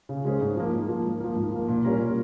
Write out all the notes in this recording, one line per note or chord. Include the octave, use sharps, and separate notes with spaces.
C#3
G#3 C#4 G#4 C5
G#2
F3 A#3
G#2
F3 A#3
G#2
F3 A#3
G#2
F3 A#3
A#2
G3 C#4 F4 A#4
A#2